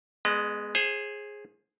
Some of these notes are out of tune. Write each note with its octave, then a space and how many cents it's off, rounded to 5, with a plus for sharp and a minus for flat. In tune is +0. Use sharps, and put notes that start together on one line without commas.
G#3 +0 B3 +0 D#5 -40
G#4 +0 C5 +35